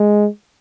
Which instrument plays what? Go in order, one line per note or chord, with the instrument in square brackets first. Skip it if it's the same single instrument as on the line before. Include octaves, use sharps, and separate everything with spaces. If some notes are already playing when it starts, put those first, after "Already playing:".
Already playing: [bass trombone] G#3